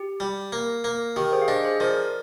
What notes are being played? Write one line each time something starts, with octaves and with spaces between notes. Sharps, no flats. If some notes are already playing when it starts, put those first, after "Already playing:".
Already playing: G4
G3
A#3
A#3
D#3 G4 A#4
G#4 C5
F5
D4 C5 D#5
G#4 C5
F3 A#4 D5